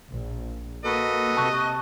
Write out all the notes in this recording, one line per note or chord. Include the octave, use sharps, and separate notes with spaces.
A#1
A#3 F#4 A4 B4 D#5
C3 A5 C#6 F#6